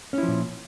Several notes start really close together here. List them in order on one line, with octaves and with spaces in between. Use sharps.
C#4 E4 F3 A#2